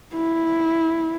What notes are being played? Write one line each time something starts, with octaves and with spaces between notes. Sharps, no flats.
E4